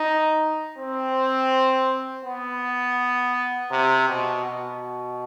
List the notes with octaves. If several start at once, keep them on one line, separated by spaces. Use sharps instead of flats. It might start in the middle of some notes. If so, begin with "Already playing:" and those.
Already playing: D#4
C4
B3
C3
B2
B2